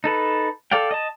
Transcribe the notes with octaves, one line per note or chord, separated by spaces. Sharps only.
D#4 A4 B4
A4 D5 F5 G5
D#5 A5